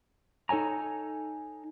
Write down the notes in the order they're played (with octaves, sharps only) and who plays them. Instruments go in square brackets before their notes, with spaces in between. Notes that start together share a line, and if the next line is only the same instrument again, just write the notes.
[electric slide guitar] D#4 A4 C#5 G#5 A#5